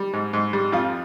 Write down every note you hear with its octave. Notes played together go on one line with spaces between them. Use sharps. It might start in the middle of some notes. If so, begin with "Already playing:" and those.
Already playing: G3
G#2
G#2
G3
F2 F4